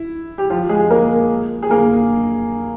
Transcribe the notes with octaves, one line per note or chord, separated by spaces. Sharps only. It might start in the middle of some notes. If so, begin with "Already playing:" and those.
Already playing: E4
G4
F3 F4
G#3 G#4
A#3 A#4
G#4
A#3 A#4